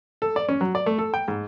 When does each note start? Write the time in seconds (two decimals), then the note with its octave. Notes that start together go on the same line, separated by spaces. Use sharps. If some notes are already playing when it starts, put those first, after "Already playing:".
0.22 A4
0.36 D5
0.49 C#4
0.61 F#3
0.75 D5
0.86 A3
0.99 A4
1.14 G5
1.28 G#2